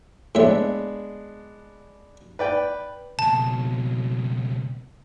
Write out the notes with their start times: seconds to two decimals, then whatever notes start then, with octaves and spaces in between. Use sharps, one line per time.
0.35 A2 G#3 B3 D4 E5
2.39 B4 D5 G5
3.19 C#2 B2 A5